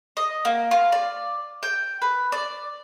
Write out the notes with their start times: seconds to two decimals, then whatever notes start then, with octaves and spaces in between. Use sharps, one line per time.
0.17 D#5
0.45 A#3
0.71 F4
0.92 D5
1.63 G5
2.02 B4
2.32 D5